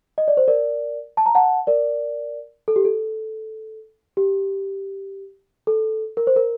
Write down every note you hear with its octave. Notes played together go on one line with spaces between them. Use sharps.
D#5
D5
C5
A#4 D5
A5
A#5
F#5 A5
A#4 D5
A4
G4
A4
G4
A4
A#4
C5
A#4